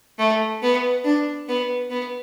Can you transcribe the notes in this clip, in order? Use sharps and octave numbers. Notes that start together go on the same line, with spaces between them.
A3
B3
D4
B3
B3